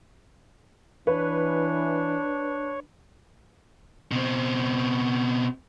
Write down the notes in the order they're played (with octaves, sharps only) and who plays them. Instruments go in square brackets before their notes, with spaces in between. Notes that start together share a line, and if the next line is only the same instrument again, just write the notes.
[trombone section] E3 [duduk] D4 [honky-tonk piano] B4 [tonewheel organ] C#5
[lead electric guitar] B2 C4